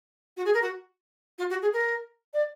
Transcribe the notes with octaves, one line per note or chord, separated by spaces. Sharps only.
F#4
G#4
A#4
F#4
F4
F#4
G#4
A#4
D5